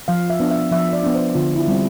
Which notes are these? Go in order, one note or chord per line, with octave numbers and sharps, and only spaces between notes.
F3 F5
E5
B3 D4
E5
F3 E5
D5
B3 D4
C5
D3 F4
E4
G3 C4